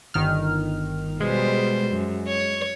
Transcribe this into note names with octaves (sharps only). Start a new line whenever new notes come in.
G1 D#3 F6
B2 G3 G#3 C5
F#2
C#5